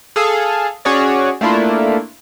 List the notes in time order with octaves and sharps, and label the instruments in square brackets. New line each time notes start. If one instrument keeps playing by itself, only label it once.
[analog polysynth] G#4 A4 F5
C#4 F#4 G#4 C#5 D5
A3 A#3 D4 E4 F4